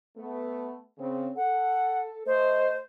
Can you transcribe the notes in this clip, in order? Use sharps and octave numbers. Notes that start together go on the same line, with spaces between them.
A3 B3
C#3 C4
A4 F#5
A3 C5 D#5